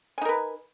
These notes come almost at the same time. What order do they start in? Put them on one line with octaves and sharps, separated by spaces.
G#5 D#4 A#4 B4